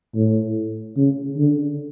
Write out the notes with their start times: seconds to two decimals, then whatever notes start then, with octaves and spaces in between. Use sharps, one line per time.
0.15 A2
0.97 C#3
1.37 D3